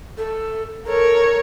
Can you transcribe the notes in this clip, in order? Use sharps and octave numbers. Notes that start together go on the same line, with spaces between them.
A4
A4 A#4 C#5